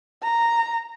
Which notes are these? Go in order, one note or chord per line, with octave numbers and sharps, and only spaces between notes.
A#5